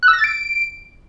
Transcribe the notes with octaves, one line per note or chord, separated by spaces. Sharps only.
F#6
E6
A#6
A6
D7